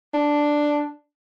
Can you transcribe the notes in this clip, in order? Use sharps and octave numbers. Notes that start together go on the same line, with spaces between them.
D4